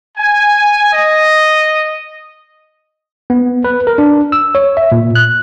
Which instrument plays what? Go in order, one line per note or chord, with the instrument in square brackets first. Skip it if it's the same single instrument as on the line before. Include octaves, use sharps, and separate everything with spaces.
[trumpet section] G#5
D#5
[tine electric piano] B3
B4
A#4
D4
E6
C#5
E5
A#2
F#6